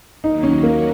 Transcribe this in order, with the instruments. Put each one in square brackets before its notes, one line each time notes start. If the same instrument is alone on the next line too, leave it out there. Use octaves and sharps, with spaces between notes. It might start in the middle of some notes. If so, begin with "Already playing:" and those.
[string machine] D#2 D#3 F#3 A#3 [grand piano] D#4
[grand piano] C#4
[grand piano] A#3 [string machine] C#4 F#4